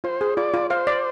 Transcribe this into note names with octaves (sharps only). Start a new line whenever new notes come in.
F4 C5
G#4
F4 D5
F4
C5 F5
D5